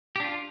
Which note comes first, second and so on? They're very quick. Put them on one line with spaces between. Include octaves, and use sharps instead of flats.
G4 D4 F4